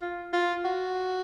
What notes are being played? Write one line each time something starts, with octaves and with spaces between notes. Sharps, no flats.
F4
F4
F#4